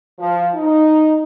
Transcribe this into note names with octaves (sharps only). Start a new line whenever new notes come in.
F3
D#4